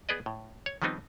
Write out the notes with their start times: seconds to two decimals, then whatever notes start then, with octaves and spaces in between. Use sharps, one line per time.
0.09 B3 G#4 B4 D5 D#5
0.26 A2
0.66 C#5
0.82 D#3 F3 G3 B3 C4 D#4